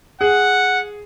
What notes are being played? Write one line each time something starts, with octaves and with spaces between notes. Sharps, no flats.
G#4 F#5